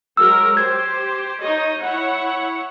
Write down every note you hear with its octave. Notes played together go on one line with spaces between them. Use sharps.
F#3 G#3 A#4 E6
G4 C5 G#6
D#4 C#5 D#5
E4 C#5 F#5